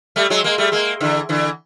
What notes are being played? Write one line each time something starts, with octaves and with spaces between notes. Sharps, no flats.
G3 A3
F#3 G#3
G#3 A#3
G3 A3
G#3 A#3
D3 E3
D3 E3